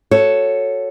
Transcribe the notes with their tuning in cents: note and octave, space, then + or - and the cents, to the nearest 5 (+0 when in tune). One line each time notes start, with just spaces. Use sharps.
F#4 +0 A4 +0 C#5 +0